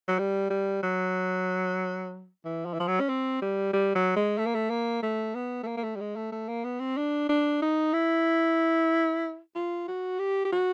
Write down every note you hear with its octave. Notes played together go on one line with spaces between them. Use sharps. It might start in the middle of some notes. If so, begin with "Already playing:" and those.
F#3
G3
G3
F#3
E3
F3
E3
F3
F#3
C#4
C4
G3
G3
F#3
G#3
A3
A#3
A3
A#3
A3
B3
A3
A#3
A#3
A3
G3
G#3
A3
A3
A#3
B3
C4
D4
D4
D#4
E4
F4
F#4
G4
G4
F#4